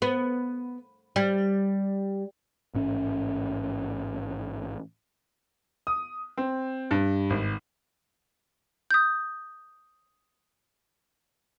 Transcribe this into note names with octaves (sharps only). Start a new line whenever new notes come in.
B3
G3
A1 G#2 C#4
D#6
C4
G2
G#1
D#6 G6